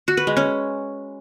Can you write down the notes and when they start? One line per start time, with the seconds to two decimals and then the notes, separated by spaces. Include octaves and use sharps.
0.08 F#4
0.17 B4
0.27 G#3
0.37 C#4